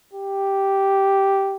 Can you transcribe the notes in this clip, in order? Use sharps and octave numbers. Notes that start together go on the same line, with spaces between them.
G4